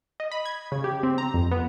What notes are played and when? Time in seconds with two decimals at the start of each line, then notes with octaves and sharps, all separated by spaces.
0.20 D#5
0.31 B5
0.45 G#6
0.72 C#3
0.84 G4
1.03 C4
1.18 A#5
1.34 F2
1.51 B3